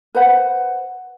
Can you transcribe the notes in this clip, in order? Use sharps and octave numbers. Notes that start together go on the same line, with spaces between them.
B4 C5 F#5